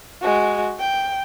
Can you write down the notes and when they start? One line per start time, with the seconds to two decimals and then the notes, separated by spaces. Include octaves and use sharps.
0.22 G#3 F#4
0.80 G5